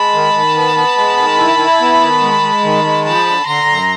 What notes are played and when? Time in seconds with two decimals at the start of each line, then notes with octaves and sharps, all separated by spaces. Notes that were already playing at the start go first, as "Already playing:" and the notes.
Already playing: G#3 A5 B5
0.14 D#3
0.34 D#3
0.55 B3
0.76 B3
0.97 G#3
1.17 D#3
1.38 E4
1.59 E4
1.80 B3
2.01 D#3
2.22 G#3
2.42 G#3
2.63 D#3
2.84 G#3
3.05 F3 A5 B5
3.26 D3
3.46 D3 A#5 C6
3.67 F#2